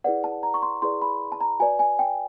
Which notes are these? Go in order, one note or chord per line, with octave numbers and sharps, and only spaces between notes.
E4 G#4 B4 D5 F#5
A5
A#5
C#6
C6
E4 G#4 B4 D5 C6
B5
A5
A#5
F#4 B4 D5 G#5
G#5
G5